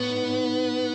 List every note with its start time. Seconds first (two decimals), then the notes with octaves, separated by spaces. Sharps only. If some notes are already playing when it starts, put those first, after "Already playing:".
Already playing: A2 B3
0.09 G#2
0.29 A2